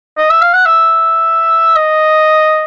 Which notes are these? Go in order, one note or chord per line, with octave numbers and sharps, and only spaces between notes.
D#5
E5
F5
F#5
E5
D#5